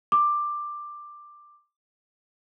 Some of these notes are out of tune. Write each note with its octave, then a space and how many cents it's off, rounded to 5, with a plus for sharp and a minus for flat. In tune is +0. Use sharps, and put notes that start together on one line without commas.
D6 +10